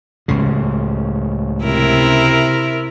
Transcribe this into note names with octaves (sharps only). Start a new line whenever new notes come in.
C#2 A2 C#3
C3 E4 A#4